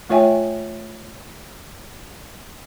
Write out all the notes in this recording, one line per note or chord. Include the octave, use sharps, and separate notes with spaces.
A3 F4 C#5 E5 G5 G#5